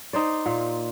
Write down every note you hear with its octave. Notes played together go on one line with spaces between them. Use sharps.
D#4 C5 D5
A#2